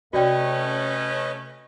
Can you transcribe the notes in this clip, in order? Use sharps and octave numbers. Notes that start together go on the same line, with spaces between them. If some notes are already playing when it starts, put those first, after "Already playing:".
C3 A3 C#4 F#4 B4 D5 D#5 G5